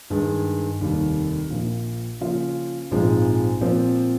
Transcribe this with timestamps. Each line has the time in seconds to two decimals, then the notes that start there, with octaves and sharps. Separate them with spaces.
0.10 G2 D#3 G#3
0.80 F1 D#2 D#3 G3
1.50 A#1 A#2 F3
2.21 C#3 F3 A#3 F4
2.91 A#1 G#2 F3 G#3 C4
3.61 A#2 F3 C4